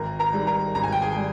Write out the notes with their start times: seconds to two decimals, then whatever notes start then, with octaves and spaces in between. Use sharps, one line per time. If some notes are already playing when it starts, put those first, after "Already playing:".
Already playing: G#1 A#4 A#5
0.19 A#4 A#5
0.33 G#2 G3
0.47 A#4 A#5
0.75 G#1 A#5
0.83 G#5
0.92 G5
1.02 G#4 G#5
1.17 G3